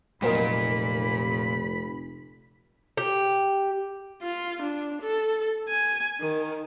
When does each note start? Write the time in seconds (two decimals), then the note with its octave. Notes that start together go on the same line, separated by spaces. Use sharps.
0.22 F1 A#2 F#3 A#3 A#4 D#5 B5
2.97 G4
4.22 F4
4.62 D4
5.02 A4
5.69 G#5
6.20 D#3